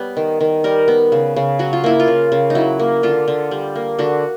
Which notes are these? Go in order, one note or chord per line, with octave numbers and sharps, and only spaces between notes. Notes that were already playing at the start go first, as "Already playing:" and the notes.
Already playing: G3 B3 B4 C#5
D#3
D#3
G3 A#4
B3
C#3
C#3
F#3 F#4
F4
A#3 E4
F4
C#3
C#3
D#4
F#3 E4
A#3
D3 F4
D3
G3
A#3
D3 F#4